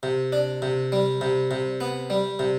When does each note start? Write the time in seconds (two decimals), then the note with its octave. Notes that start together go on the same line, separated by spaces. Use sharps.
0.03 C3
0.32 D4
0.62 C3
0.92 G3
1.21 C3
1.51 C3
1.81 B3
2.10 G3
2.39 C3